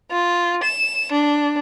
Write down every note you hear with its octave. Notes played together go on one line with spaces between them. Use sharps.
F4
E7
D4